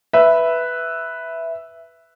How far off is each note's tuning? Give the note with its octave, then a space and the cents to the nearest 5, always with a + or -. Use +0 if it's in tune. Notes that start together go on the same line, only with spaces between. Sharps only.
B4 +0 E5 +0